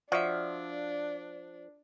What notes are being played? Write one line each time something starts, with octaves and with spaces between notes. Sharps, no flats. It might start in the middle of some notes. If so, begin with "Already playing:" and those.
F3 D4 F#4 D5 E5